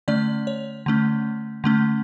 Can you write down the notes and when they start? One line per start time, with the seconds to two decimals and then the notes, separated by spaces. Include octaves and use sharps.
0.08 D3 A3 C#4 D5
0.47 C#5
0.86 D3 A3 C#4
1.64 D3 A3 C#4